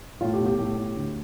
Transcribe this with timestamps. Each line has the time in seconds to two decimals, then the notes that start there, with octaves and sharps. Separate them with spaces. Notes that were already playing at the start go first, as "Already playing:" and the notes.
0.21 A2 F4
0.34 G4
0.40 B1
0.46 G4
0.59 A2
0.77 A2
0.96 D2